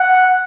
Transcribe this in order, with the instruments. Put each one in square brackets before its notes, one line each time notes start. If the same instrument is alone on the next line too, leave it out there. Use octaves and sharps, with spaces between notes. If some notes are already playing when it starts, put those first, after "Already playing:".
Already playing: [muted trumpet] F#5